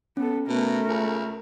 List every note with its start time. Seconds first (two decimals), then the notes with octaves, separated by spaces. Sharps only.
0.17 B3 C#4 A4
0.48 B2 A3 A#4
0.88 C#2